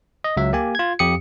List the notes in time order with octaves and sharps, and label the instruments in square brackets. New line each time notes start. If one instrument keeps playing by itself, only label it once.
[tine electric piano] D#5
C#2 F#3 E5
A#3 G4 G#5
F4 G#6
F2 G4 D#6 C#7